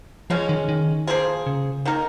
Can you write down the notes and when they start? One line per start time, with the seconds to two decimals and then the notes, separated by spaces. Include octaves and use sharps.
0.30 C#3 F3 G#3 C#4
0.49 D#3
0.69 D#3
1.07 F3 A#3 F4 G#4
1.47 C#3
1.85 D#3 A#3 D#4 A#4